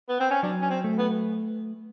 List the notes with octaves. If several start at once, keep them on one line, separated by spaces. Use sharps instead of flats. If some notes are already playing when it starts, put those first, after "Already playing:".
B3
C4
C#4
F#3 D4
C#4
C4
A3
B3